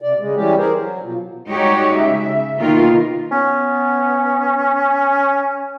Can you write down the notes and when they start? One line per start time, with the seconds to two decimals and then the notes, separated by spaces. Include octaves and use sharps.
0.01 C3 D5
0.20 C#3 G#3
0.36 E3 G3 C#4 G4
0.58 G#4 A#4 C5
0.75 F#3
1.02 B2 F3
1.49 G3 G#3 D#4 F#4 G4 C#5
1.95 C#3 E5
2.58 B2 D#3 A#3 D#4 F4 A#4
3.31 B3 C#4